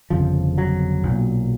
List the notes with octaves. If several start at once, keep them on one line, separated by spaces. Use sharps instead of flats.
G1 F2 C#3 F3
F#3
B1 A#2